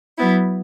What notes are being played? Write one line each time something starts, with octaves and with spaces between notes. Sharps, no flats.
F#3 B3 E4